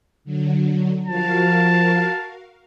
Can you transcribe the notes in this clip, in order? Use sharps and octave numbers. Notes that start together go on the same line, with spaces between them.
D3 F#3
F3 F#4 A#4 F5 A5